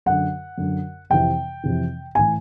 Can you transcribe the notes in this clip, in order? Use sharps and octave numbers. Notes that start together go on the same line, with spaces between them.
F#2 D3 F#5
F#2 D3
F2 C3 E3 G5
F2 C3 E3
A2 E3 G#5